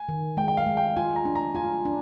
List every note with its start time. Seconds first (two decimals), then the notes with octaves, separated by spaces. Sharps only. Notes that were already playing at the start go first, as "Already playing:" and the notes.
Already playing: G#5
0.09 D#3
0.37 G#3 G5
0.48 G5
0.57 F5
0.66 G#3
0.77 G5
0.96 F4 G#5
1.16 A#5
1.25 D4
1.35 A#5
1.55 F4 G#5
1.85 D4